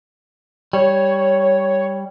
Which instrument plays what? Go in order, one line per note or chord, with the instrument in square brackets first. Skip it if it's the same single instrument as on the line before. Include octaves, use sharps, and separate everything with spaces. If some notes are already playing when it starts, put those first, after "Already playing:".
[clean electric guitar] G3 [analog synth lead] C#5